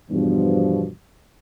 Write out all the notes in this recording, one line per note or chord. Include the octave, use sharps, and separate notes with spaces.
E2 G2 B2 F3